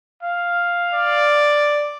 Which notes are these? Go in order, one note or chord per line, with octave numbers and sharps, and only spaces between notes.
F5
D5